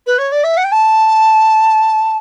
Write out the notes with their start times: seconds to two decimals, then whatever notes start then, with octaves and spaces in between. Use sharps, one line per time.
0.07 B4
0.18 C#5
0.32 D5
0.44 E5
0.57 F#5
0.64 G5
0.72 A5